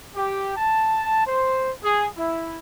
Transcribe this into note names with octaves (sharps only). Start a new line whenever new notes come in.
G4
A5
C5
G#4
E4